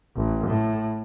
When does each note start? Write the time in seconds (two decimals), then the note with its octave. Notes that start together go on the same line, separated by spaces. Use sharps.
0.17 A1
0.47 A2